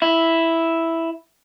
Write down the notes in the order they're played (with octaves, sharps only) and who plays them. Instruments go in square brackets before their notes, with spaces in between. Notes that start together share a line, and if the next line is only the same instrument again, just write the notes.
[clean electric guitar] E4